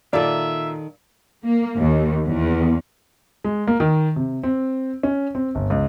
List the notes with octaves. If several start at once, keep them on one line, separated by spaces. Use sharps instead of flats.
A#2 D#3 A4 D5 E5
A#3
D#2
E2
G#3
A#3
D#3
C3
C4
C#4
C4
G1
C#2